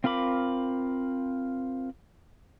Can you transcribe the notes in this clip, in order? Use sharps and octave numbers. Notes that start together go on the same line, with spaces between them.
C4 F4 A#4 B5 D6